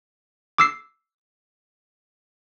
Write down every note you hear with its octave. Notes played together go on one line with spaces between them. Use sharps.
D6 E6 C7